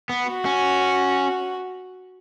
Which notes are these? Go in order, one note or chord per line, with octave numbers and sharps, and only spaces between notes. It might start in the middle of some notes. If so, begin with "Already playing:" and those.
B3
F#4
C#4